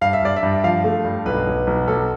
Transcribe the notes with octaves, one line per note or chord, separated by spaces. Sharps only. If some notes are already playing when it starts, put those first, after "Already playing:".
G2 F5
E5
G2 D5
E5
G2
F3 F5
A3
G2
B1 B4
B1
B1
B1 A4